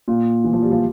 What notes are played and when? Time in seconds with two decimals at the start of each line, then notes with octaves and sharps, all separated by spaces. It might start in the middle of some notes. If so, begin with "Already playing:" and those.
0.08 A#2
0.44 E3
0.53 F3
0.62 G3
0.71 F3
0.76 G3